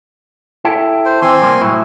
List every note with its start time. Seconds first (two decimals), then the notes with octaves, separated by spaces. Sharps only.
0.65 E4 G4 A4
1.05 C5
1.22 E3 C4 G#5 C6
1.42 C3 G3 A#3
1.61 A2 F#3 E4